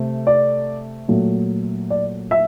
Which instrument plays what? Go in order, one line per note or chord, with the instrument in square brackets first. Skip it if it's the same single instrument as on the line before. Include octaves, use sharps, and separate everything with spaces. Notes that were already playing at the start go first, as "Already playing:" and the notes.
Already playing: [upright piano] C3 A3
D5
A#2 F#3 A3
D5
E5